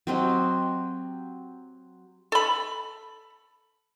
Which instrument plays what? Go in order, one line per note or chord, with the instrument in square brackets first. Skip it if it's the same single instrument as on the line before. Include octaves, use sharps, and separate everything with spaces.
[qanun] F#3 C4 G4 D#5
[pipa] A4 B5